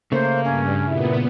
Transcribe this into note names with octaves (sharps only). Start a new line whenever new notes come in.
C#3 A3 A#3 C5
G2 C#4
A#2 B3 E4